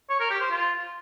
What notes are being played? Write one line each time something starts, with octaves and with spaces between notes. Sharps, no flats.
C#5
A#4
G4
C5
F4